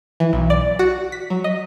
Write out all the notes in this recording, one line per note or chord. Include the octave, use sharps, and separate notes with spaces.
E3
B1
D5
F#4
B6
F#3
D#5